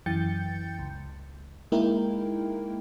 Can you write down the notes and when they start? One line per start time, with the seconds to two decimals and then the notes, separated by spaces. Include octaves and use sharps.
0.06 F#2 E3 G5 G6 A6 C#7
0.79 C#2
1.72 G#3 A#3 D#4 E4 A#4 G5